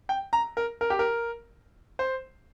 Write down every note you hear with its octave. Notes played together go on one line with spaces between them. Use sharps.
G5
A#5
A#4
A#4
G4
A#4
C5